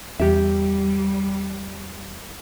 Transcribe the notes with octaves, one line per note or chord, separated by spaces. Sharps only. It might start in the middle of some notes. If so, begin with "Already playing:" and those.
E2 G3 G4 E5